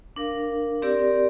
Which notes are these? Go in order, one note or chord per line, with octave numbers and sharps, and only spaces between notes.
D4 A#4 F5
C4 G4 A#4 D5